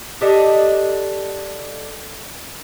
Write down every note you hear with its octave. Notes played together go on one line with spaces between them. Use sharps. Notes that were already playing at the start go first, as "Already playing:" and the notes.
D4 G4 A4 D#5